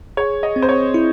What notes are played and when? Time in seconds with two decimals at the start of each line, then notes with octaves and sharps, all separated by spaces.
0.17 G#4 C#5
0.43 D#5
0.56 C4
0.62 C5
0.69 C#5
0.94 E4